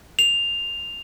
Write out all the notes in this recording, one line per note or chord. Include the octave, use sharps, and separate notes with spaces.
F7